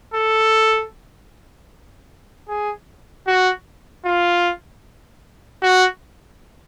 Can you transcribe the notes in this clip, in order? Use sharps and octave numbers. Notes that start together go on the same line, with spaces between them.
A4
G#4
F#4
F4
F#4